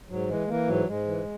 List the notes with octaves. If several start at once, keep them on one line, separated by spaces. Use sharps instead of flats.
G#2 F#3
E3 G#3
E3 A#3
G#2 F#3
G#2 G#3
E3